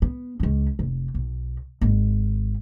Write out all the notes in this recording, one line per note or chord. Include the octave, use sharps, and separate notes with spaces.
B3
C#2 C#4
F1
B1
G#1